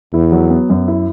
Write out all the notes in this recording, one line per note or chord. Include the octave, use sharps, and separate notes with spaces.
E2 E4
F#3
B3
F#2
E4